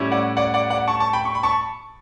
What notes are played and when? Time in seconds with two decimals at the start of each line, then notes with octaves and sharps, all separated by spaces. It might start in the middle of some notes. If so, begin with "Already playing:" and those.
Already playing: A2 G3 C#4 E4
0.12 D5 F#5
0.37 D5 F#5
0.54 D5 F#5
0.70 D5 F#5
0.88 A5 C#6
1.00 A5 C#6
1.13 G5 B5
1.25 C#6
1.35 B5
1.43 A5 C#6